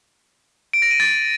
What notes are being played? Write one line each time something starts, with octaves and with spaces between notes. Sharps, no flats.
D7
A#6
D#7
A6